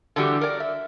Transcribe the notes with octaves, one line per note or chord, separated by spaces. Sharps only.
D3 E3 G3 F#4 G4
A#4 D5
E5